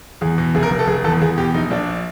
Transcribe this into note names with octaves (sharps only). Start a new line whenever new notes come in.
E2 G#4
B2
F1 G#4
A#4
F1
A4
F1 G#4
E2 A4
E2 G#4
B2 G4
A#1 D#4
A#1 D4